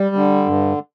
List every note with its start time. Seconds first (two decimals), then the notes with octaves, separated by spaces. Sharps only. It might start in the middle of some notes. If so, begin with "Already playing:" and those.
Already playing: G3
0.16 D3
0.46 G2